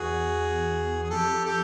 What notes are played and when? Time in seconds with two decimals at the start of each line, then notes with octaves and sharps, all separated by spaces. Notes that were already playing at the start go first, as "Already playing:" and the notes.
Already playing: E2 F#4 G#4
1.03 G#4
1.10 F2 G4 A4
1.45 G4 A4